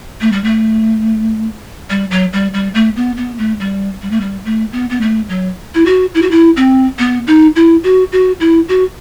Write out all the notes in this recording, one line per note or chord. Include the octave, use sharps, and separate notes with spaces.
A3
G3
A3
G3
F#3
G3
G3
A3
B3
B3
A3
G3
G3
A3
G3
A3
B3
B3
A3
F#3
E4
F#4
E4
F#4
E4
C4
B3
D#4
E4
F#4
F#4
E4
F#4